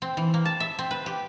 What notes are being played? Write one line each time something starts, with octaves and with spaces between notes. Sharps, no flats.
C4
E3
A#3
A5
E5
C4
B4
G4